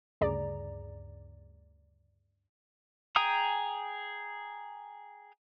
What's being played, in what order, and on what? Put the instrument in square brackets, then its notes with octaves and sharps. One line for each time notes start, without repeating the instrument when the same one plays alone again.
[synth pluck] D2 G2 C#3 G#4 D5 A#5
[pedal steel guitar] G#4 G5 G#5 A#5 D#6